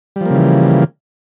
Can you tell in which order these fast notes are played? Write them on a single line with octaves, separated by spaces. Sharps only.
G3 F3 A#3 C#3 E3